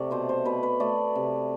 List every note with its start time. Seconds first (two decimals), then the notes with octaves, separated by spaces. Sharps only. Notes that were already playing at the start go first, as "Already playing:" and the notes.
Already playing: C3 A3 D5
0.11 B2 C5
0.29 C5
0.45 B2 B4
0.63 B4
0.80 A3 D5
1.15 C3